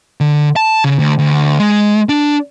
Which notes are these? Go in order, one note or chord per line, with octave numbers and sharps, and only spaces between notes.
D3
A5
C#3
D2
D2
G#3
D4